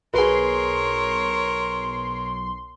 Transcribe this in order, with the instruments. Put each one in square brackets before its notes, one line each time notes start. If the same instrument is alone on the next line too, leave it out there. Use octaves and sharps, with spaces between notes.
[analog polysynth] B1 C6 [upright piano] G#4 B4 [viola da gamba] A#4 C#5